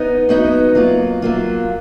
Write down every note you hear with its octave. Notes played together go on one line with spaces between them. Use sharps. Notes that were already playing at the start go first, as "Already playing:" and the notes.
Already playing: B3 D#4
F#3 B3 D#4
F#3 A#3 F4
F#3 A#3 F4